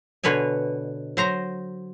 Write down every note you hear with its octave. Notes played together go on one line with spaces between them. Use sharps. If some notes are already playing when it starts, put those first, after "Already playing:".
B2 D3 B4 C#5 G#5
F#3 C5 A#5